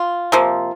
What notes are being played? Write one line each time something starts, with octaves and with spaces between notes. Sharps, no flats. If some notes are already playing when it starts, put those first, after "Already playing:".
Already playing: F4
C3 F3 A#3